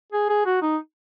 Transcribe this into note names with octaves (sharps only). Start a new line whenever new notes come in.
G#4
G#4
F#4
D#4